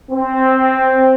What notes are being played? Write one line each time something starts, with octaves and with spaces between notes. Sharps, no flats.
C4